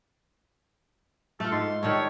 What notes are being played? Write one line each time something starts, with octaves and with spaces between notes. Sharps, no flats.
A3 F4 A4
G#2 C6
D#3 G3 A4 C#5